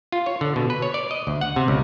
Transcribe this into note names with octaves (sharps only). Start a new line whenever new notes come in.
F4
C#5
D3
B2
B4
C#5
D5
D#5
D2
F#5
C3
C#2